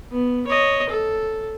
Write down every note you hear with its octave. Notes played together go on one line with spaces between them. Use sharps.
B3
C#5 D#5
A4